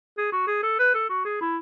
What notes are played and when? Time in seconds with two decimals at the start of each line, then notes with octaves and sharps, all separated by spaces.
0.17 G#4
0.32 F#4
0.47 G#4
0.63 A4
0.79 B4
0.94 A4
1.09 F#4
1.25 G#4
1.41 E4